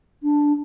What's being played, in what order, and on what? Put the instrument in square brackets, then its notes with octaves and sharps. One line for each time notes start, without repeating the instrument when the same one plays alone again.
[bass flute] D4